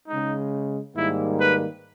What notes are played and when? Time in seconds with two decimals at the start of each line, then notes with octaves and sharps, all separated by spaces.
0.08 C#3 G#3 D#4
0.96 G#2 D#3 G3 A#3 E4
1.41 B4